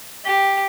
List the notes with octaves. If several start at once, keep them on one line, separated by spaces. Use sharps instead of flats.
G4